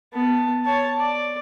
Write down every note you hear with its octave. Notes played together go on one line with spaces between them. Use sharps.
B3 A5
C#5 A5
D5